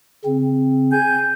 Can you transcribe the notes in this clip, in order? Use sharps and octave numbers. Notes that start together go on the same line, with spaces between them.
C#3 C4
G#5 G6